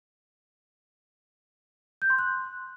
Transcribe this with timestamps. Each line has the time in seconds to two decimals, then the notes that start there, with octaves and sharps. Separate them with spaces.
2.02 G6
2.10 C6
2.19 F#6